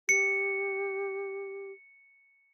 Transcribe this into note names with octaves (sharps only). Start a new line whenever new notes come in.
G4 C#7